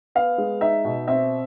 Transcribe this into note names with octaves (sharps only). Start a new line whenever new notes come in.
B3 F5
G#3
D#4 E5
B2
C4 E5